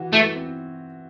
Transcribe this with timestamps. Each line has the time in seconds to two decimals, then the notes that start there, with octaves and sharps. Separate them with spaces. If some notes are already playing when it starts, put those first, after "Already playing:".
Already playing: E3 F#4
0.13 E3 A3
0.35 C4